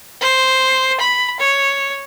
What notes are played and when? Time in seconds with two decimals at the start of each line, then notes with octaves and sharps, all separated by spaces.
0.21 C5
1.00 B5
1.40 C#5